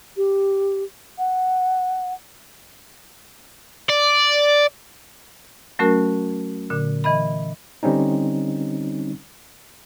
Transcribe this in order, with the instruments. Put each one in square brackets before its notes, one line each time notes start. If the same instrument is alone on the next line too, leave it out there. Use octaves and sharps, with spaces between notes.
[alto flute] G4
F#5
[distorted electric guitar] D5
[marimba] F#3 A3 C#4 F#4 A#4
A#2 D3
E3 D#5 B5
[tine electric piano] D3 G3 C4 C#4 D#4